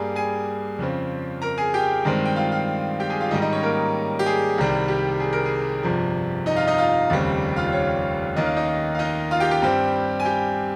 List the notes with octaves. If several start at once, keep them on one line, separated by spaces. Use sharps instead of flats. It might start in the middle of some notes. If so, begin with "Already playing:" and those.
Already playing: G2 G3 A#3 G#4 G#5
G#4 G#5
F2 C#3 F3 C4
A#4 A#5
G#4 G#5
G4 G5
G2 D#3 G#3 C4
G5
F4 F5
F4 F5
G4 G5
G#4 G#5
F4 F5
G#2 D#3 G3 D#4 D#5
D#4 D#5
C#4 C#5
A#3 A#4
G4
G#4
C2 C3 D#3 G3
G4
G#4
A#4
G#4
G1 F2 C3 F3
D#4 D#5
F4 F5
D#4 D#5
F4 F5
F1 D#2 C#3 G3 C4
F4 F5
C#4 C#5
D#2 D#3 A#3 C#4 D#5
F5
D#4 D#5
F5
D#4 D#5
F4 F5
G4 G5
G4 G5
G2 G3 C4
G#5
G4 G5